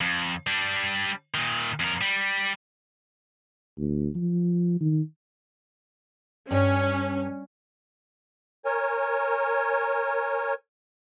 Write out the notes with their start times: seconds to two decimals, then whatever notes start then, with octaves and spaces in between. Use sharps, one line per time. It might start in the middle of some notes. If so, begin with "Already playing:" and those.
0.01 F2
0.47 G3 D4
1.34 A#2 D#3
1.80 F2 A#4
2.01 G3
3.77 D2
4.15 F3
4.81 D#3
6.51 G2 C#4
8.65 A#4 C#5 G#5